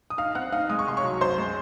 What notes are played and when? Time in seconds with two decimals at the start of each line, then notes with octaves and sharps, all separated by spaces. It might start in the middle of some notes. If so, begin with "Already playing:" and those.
0.10 D#6
0.18 D#4 F5 F6
0.35 C4 F#5 F#6
0.52 D#4 F5 F6
0.70 G#3 D#6
0.79 C#6
0.87 C2 C6
0.97 C#5 C#6
1.04 F#3
1.21 F#2 C5 C6
1.38 G#3